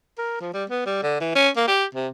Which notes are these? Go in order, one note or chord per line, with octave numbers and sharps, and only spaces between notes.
A#4
F3
G3
B3
G3
D3
E3
C#4
A#3
G4
C3